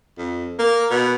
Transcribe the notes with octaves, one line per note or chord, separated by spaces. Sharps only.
F2
A#3
B2